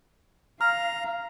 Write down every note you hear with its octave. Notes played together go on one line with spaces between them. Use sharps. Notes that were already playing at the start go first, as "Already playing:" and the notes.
F5 A#5 F6